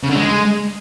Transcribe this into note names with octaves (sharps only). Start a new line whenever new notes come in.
C#3
D3
G#3